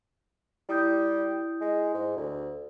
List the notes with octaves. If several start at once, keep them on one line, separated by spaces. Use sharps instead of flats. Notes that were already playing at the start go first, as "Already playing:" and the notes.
G3 E4 D#6 G6
G#3
G#2
D2